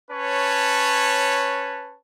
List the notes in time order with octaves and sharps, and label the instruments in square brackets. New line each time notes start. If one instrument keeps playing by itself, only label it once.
[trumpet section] C#4 B4 C#5 A5